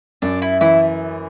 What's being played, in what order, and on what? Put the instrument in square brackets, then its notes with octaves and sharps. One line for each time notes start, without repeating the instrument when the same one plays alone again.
[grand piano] F#2 [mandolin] D4
[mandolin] E4
[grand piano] E3 [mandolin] E4